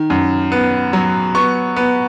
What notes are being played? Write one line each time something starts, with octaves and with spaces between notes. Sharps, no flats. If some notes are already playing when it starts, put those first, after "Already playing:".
Already playing: D#3
F#2
B3
F#3
B3 C#6
B3